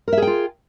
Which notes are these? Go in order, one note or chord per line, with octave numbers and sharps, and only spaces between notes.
F4 G#4 A#4 E5 G5